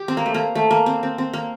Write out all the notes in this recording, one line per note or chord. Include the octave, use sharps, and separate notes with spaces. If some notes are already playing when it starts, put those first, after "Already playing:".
Already playing: G4
C4
A#3
A3
A#3
A3
A#3
C4
C4
C4
A#3